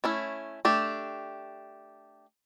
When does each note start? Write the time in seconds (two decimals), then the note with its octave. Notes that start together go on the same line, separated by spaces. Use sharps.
0.04 A3 C#4 E4
0.65 A3 D4 G4